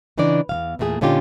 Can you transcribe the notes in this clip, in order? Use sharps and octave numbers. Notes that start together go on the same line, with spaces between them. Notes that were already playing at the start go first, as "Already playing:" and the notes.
C#3 E3 D4 D#4 D5
E2 E3 F5
E2 A#2 A3 F#4 G#4
A#2 D3 C#4 D#4 F4 G4